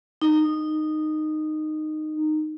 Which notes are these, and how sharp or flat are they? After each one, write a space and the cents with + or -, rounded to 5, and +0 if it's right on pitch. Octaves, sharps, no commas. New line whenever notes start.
D#4 -15